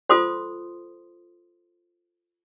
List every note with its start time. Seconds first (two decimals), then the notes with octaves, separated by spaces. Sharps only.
0.09 F4 A4 C5 C6 D#6